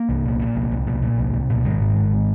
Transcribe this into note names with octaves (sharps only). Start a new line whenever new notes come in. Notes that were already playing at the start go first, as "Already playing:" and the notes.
Already playing: A#3
C2
A#2
A#2
C2
C2
A#2
A#2
C2
C2
A#2
G#2 D#3 G#3
G#1
G#1